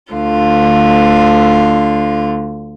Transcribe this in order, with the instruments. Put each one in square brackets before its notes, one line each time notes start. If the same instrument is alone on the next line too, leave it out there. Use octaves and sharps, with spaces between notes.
[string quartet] D2 D3 F4